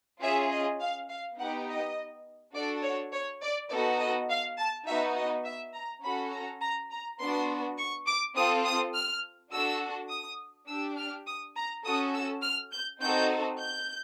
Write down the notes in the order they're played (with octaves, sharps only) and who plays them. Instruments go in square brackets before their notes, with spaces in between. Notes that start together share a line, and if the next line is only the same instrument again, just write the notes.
[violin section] C#4 F4 G#4 E5
D#5
F5
F5
B3 D#4 G4 F#5
D#5
D4 F#4 A4 D5
C#5
C#5
D5
B3 D#4 F#4 A4 D5
D#5
F5
A5
B3 D#4 F#4 E5
D#5
E5
A#5
C#4 F#4 A4 B5
A#5
A#5
A#5
B3 D4 F#4 C6
C#6
D6
C4 F4 A4 D#6
D#6
F6
D4 F#4 A4 E6
D#6
D4 G4 E6
F6
D#6
A#5
C#4 F#4 A4 D#6
E6
F6
G6
C4 D#4 F#4 A4 G6
G6